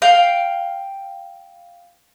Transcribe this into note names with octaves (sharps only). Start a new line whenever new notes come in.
F5 G5